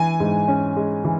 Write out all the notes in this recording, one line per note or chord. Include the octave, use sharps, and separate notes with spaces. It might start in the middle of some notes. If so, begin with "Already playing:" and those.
Already playing: E3 G#5
G#2
C#4
G#3
E3